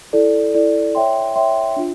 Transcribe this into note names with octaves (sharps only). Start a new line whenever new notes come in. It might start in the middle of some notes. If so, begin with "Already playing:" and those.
E4 A4 D5
E4 A4 D5
C#5 E5 G5 C6
C#5 E5 G5 C6
D4 F4